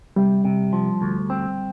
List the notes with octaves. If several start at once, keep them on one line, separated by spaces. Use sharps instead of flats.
C3 G3
C3
F3
D2
C4